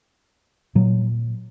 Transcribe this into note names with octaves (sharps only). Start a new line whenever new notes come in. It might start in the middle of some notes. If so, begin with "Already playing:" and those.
A#2 F#3